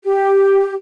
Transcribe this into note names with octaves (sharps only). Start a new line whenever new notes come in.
G4